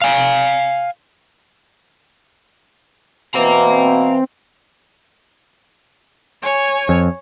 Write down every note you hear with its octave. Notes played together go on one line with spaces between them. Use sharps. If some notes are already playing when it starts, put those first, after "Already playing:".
F5 G#5
B2 E3 C4 F5 A#5
C#5 G#5
F2